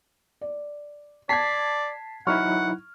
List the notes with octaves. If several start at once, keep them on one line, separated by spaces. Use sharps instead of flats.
D5
D5 A5 G#6 B6 C7
F#3 D#4 E4 F#5 C#6 F6